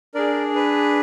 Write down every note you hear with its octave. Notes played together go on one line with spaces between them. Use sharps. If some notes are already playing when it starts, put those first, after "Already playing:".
D4 G#4 A#4 D5
B4